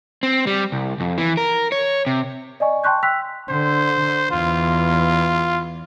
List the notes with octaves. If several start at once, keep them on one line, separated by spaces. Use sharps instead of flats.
C4
G3
C2
F2
E3
A#4
C#5
C3
D5 D#5 G#5 C#6
G5 A5 C6 C#6 F#6 G6
G5 C6 E6 F#6 B6 F7
D3 C5
E2 F4